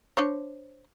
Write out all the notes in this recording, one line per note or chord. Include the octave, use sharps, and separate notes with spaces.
D4 C5 C#5